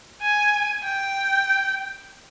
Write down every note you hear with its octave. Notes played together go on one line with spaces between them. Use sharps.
G#5
G5